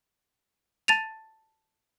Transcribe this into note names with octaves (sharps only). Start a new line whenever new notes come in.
A5 A6 D#7 F7